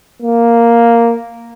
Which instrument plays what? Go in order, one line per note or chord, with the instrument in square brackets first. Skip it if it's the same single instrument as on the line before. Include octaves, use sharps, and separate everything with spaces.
[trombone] A#3